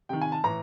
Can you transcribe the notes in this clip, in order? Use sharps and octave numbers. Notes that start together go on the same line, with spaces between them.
C3 D#3 G5
G#5
A5
A2 E3 A#5